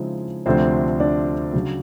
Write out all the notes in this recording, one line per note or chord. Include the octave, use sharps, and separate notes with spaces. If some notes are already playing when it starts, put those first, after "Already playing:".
Already playing: C#3 F3 G#3 C4 D#4 E4
D2 C3 F3 A3 C4 D4 C5
D4 D5
C#3 F#3